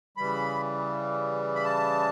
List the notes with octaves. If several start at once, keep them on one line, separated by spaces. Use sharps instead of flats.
C#3 E3 G3 B5
B5
A5